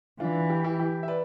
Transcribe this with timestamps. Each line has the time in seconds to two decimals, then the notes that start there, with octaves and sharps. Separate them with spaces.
0.20 E3 D4 F4
0.49 E4 G4
0.64 E4 G4
0.79 E4 G4
1.03 E5
1.08 B4 D5